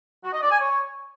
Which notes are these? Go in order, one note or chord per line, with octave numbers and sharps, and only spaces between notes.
F#4
D#5
D5
G#5
C#5